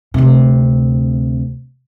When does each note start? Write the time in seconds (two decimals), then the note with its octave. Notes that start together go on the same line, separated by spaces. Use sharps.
0.14 D2 C3